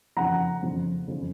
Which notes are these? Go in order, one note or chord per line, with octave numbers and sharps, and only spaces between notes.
F2 C#3 F3 F#5 A#5
F2 C#3 F3
F2 C#3 F3